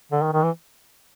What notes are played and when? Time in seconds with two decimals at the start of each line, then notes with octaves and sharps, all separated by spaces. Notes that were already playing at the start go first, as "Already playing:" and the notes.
0.12 D3
0.22 D#3
0.33 D#3
0.43 E3